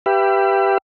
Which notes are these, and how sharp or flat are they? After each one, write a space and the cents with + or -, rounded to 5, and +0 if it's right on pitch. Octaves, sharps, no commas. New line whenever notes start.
G4 +0 B4 +0 E5 +35